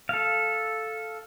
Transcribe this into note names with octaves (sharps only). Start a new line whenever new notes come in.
A4 F5